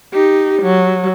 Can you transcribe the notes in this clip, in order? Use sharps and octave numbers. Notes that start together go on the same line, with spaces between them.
D#4 G4
F#3